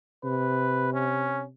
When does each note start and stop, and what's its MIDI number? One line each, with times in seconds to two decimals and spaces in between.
0.24 1.51 48
0.24 0.92 71
0.93 1.43 61